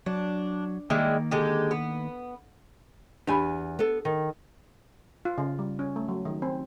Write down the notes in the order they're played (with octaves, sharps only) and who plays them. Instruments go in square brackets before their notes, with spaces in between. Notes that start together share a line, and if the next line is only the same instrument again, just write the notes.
[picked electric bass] F#3 [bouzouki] D4
[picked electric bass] D#3 A#3 [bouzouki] G3 G#3 E4
[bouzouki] D3 G#3 G4
B3
[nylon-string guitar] E2 G#5 [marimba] D4 G4 B5
[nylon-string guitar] B3 A4
D#3
[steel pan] F4
C#3
G3
C#4
A3
F#3
D#3
C4